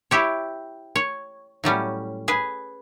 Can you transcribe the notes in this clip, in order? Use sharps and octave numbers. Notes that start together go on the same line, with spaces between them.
E4 G4 C#5
C#5
A2 F#3 G3 C#4
G#4 B4